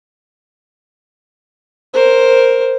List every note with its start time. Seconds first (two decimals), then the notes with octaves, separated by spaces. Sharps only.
1.94 A#4 C5